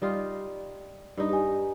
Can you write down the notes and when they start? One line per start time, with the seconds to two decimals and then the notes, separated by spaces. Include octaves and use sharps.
0.02 G3 D#4 F4
1.17 G2 D#4
1.29 G4 G#5